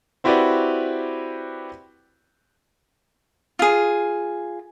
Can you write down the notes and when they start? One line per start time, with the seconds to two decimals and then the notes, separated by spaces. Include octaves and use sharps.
0.24 C4 E4 F#4 G4 B4 D5
3.59 F4 G#4